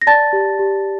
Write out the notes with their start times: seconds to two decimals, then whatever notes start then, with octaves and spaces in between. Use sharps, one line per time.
0.02 A#6
0.07 D5 A5 A6
0.33 G4
0.59 G4